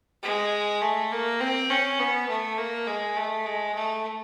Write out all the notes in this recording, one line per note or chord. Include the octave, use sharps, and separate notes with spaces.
G#3
A3
A#3
C4
C#4
B3
A3
A#3
G#3
A3
G#3
A3